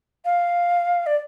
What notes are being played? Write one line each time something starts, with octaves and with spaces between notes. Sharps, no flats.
F5
D5